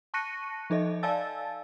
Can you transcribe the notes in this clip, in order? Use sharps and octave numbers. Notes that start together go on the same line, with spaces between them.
A5 C#6 F#6 A#6 C#7 D#7
F3 D#4 A4 D#5 E5
D5 F5 G#5 A5 E6 A6